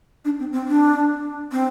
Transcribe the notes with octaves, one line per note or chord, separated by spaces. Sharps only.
D4
C4
C4
D4
C4